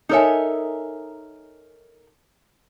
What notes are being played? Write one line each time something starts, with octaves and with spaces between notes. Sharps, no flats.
D#4 A4 A#4 C#5 E5 G#5